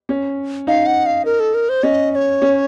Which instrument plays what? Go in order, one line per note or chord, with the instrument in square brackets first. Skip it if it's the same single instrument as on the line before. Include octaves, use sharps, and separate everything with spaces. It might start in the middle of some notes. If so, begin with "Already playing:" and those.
[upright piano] C#4
[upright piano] D#4 [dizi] F5
[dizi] F#5
F5
A#4
A4
A#4
C5
[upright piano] C#4 [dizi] D#5
[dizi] D#5
C#5
[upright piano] C#4